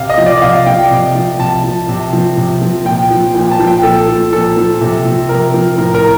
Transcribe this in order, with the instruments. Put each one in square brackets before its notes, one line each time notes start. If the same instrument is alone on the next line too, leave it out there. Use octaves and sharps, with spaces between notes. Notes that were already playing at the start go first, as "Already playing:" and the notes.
Already playing: [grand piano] C3 F5
D#5
F3
D5
C3 F5
F3 G5
C3
F3
C3 A5
F3
C3
F3
C3
F3
A#2 G5
F3
A#2 G5
A5
F3
G5
A#2 A4
F3
A#2 A4
F3
C3
F3
C3 A#4
F3
A2 A#4
A#4